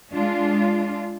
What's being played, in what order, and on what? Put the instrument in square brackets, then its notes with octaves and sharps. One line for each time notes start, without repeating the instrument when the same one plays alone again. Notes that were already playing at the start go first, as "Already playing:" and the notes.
[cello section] G#3 D4 F4